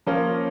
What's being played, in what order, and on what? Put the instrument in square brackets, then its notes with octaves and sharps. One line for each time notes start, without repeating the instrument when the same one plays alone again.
[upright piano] F3 A#3 C#4 F4